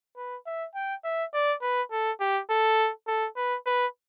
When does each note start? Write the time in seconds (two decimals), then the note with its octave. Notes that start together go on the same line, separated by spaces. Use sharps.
0.17 B4
0.46 E5
0.75 G5
1.04 E5
1.34 D5
1.62 B4
1.91 A4
2.20 G4
2.50 A4
3.07 A4
3.36 B4
3.66 B4